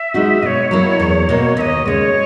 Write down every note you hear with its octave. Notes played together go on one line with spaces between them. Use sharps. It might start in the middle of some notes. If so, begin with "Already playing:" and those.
Already playing: E5
G#3 D#4 F#4
B2 C#5 D#5
F#3 A#3 E4
E2
B2 A#3
D#2 D#5 E5
C#3 G#3 C#5 D#5